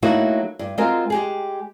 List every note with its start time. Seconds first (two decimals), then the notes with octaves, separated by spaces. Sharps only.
0.03 F#3 A3 A#3 D#4 E4 F#4
0.59 G2
0.78 G#3 C4 F4 F#4 A#4
1.10 G#3 G4 G#4